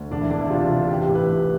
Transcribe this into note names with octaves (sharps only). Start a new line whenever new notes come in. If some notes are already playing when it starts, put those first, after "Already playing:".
Already playing: D2
E1 D4
E4
E2 D4
E4
C3 F4
C3
A1 G4
G4
A1
B4
A2